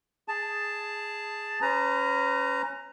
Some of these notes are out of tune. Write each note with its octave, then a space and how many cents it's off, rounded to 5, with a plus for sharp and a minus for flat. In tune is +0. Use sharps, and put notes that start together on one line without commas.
G#4 +0 A5 +0
C#4 +0 B4 +35 A#5 +0